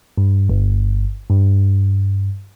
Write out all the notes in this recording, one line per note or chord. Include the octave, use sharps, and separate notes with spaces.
G2
G1
G2